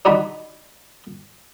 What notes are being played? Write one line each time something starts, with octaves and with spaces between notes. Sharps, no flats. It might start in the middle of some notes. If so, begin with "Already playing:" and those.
D4 D#4 F#4 B5